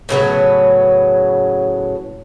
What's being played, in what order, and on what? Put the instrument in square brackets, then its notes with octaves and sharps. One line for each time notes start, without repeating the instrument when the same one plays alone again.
[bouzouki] A2 C#3 F#3 B3